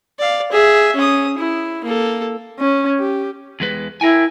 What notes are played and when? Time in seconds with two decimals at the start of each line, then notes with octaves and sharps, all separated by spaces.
0.20 D5 F5
0.52 G#4 E5
0.96 C#4 D#6
1.38 E4
1.84 A#3 A4
2.59 C#4
3.00 G4
3.60 E2 G#3 B4
4.01 E4 A#4 G5 G#5